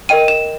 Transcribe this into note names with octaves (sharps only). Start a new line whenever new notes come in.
A#4 D#5 G5 D#7
E7